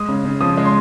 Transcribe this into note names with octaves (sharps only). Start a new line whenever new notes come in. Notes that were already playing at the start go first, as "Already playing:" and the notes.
Already playing: G#3 D#6
C#3
C#3
F3 D#6
G#3
C6